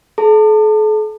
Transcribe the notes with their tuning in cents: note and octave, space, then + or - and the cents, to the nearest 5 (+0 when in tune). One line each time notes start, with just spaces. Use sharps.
A4 -45 A5 +35